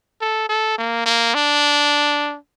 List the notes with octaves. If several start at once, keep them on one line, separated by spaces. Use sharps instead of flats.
A4
A4
A#3
A#3
D4